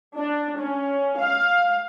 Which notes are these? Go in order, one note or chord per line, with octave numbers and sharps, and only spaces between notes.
D4
C#4
F5